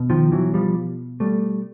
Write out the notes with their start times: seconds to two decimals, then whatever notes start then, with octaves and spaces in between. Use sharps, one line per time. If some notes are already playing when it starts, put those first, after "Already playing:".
Already playing: B2
0.10 D#3 F3
0.32 E3 F#3
0.54 F3 G3
1.20 G3 A3